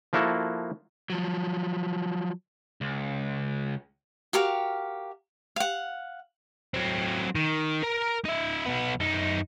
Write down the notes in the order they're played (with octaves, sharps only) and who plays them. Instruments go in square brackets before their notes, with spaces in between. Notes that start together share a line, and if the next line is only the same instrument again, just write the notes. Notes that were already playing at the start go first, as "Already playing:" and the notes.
[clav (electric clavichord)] F3 A#3 E4 F#4 A4
[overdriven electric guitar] F3 F#3
[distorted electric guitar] C#2
[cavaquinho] F#4 G4 A#4 F5
F5 F#5
[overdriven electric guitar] F#3 C4
D#3
A#4 A#5
D#4 E5
B1 B3
F#2 D#4